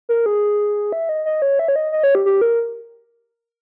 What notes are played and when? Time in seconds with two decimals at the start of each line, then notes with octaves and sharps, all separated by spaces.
0.09 A#4
0.26 G#4
0.92 E5
1.09 D#5
1.26 D#5
1.42 C#5
1.59 E5
1.68 C#5
1.76 D#5
1.92 D#5
2.03 C#5
2.15 G4
2.26 G4
2.41 A#4